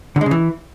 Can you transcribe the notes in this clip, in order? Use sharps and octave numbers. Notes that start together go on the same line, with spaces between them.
D3
G#3
C#3
E3